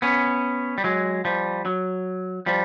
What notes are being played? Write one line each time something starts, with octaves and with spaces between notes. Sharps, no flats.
B3 C#4
G3
F#3 G#3
F3 G3
F#3
F3 G3